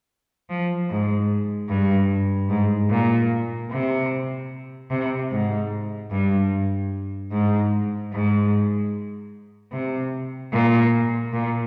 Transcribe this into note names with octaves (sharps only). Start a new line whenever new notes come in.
F3
G#2
G2
G#2
A#2
C3
C3
G#2
G2
G#2
G#2
C3
A#2
A#2